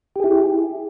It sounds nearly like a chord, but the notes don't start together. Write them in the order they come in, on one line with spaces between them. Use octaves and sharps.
G4 G#4 E4